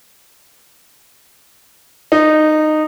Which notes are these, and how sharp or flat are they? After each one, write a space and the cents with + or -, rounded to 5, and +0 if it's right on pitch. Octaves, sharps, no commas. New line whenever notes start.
D#4 -15